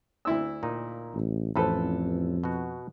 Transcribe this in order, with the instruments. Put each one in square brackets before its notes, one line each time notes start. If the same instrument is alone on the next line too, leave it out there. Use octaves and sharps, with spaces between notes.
[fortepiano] D2 E4 E6
[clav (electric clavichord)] A#2 D#4
[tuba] A1
[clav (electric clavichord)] A1 B4 [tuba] F2 [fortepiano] C4 A4 B5
[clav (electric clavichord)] B2 F#4